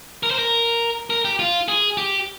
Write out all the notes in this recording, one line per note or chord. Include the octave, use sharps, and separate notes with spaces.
A#4
C5
A#4
A#4
G4
F4
G#4
G4